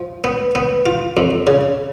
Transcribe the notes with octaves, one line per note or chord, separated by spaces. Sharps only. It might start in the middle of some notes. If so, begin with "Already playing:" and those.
Already playing: F3
B3
B3
F4
F2
C#3